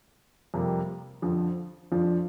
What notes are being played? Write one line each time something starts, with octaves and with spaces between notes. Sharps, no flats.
F2 C3 G3 A#3
F2 D3 F3
F2 F3 D4